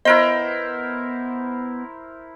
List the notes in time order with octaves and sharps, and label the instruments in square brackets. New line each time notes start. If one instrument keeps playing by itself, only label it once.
[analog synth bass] B3 [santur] E4 A#4 C5 [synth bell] D#5